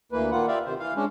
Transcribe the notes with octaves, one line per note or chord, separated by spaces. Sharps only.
D2 E3 A#3 B4
A#2 D#3 A#3 F4 F#5
F4 G4 D5 E5 F5
C3 D#3 C5
E3 F5
G#3 C#4 D4